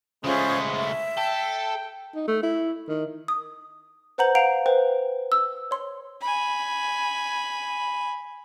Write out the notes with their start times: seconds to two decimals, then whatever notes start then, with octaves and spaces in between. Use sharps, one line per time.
0.24 C#3 G#3 A3 C#4 F4 C5
0.76 E5
1.17 A4 G5
2.15 D#4
2.27 A3
2.43 E4
2.88 D#3
3.28 D#6
4.18 B4 C5 F#5 A#5 G6 F#7
4.35 F5 F#5 A#5 C7 D7 F7
4.66 B4 C5 G5
5.32 E6
5.71 C#5 C6
6.21 G#5 B5